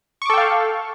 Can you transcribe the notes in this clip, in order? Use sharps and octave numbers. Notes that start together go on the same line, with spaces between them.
A4 F5 G5 C#6 D6